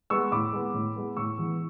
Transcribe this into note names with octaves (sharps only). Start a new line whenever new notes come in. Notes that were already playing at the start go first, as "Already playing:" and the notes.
G#3 B3 C#6 E6
A2 B5 D6
G#3 B3
A2
G#3 B3
A2 C#6 E6
E3 G#3 B3